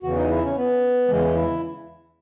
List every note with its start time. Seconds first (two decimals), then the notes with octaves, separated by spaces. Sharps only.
0.03 E2 C#3 E3 F#4
0.16 D#4
0.29 E4
0.43 C#4
0.56 B3
1.08 E2 C#3 E3 G#3
1.34 E4